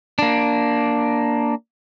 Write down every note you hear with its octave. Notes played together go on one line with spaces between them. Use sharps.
A#3 D4